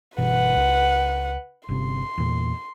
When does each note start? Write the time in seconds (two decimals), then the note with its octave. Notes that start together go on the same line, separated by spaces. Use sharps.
0.18 G1 B2 E3 B4 F#5
0.56 C#2
1.69 G1 C3 C6
2.18 E2 A#2